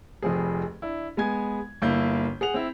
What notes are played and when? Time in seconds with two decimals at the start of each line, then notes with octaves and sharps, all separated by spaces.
0.22 F1 F2 C4 G#4
0.82 D4 E4
1.17 G#3 B3 G#5 G#6
1.82 G1 A#3 E4 G6
2.41 G#4 F#5 F7
2.54 C4 E4